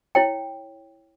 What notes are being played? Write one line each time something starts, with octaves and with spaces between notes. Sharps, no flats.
E4 C#5 G5